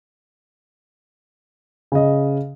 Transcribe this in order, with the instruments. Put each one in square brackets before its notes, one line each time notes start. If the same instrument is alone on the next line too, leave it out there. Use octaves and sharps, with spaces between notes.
[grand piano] C#3 D#5